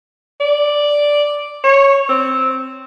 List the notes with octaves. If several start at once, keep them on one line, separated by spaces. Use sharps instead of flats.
D5
C#5
C4